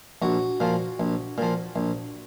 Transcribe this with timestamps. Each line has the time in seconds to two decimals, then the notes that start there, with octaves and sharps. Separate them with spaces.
0.22 A#1 F#4
0.60 A#2 F3
1.00 A#1
1.38 A#2 F3
1.76 A#1